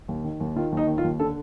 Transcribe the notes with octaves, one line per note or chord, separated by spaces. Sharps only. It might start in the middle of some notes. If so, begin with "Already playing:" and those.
D#2
D#3
D#2
D#3 F4
D#2
D#4
D#3
F4
D#2
D3 A4